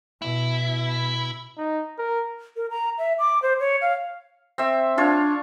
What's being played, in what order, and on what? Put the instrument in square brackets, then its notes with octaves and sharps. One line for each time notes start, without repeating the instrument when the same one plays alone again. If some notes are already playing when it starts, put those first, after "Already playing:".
[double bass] B2 [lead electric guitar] E4
[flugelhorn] D#4
A#4
[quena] A#4
A#5
E5
D6
C5
C#5
F5
[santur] C4 E5
[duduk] D4 [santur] F4 C#5